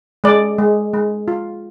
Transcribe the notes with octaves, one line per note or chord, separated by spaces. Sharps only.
G#3 D5
G#3
G#3
F4